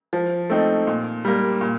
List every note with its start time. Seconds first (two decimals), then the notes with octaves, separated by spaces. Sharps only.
0.13 F3
0.50 A3 C4 D#4
0.87 A#2
1.25 G3 A#3
1.61 A#2